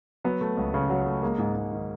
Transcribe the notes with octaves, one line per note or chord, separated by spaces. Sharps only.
F#3 B3
A3
C#2
C#3
F#3
A3
G#3 A#3
G#2
G#2
D#3